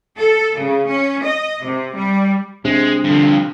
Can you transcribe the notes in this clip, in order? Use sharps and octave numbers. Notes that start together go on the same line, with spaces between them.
A4
C#3
C#4
D#5
C3
G3
C3 G#3 D4
G2 D3 F3